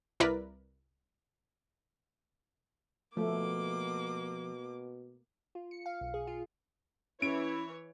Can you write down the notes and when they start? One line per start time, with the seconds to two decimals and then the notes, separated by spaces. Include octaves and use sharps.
0.20 C2 E4 A#4 B4 D5 B6
3.17 B2 F3 A3 A#3 D6
5.55 F4
5.71 C#7
5.86 F5
6.01 B1
6.14 G#4
6.27 F4
7.22 E3 C#4 E4 C#5 D7